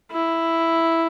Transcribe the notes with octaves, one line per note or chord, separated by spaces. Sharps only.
E4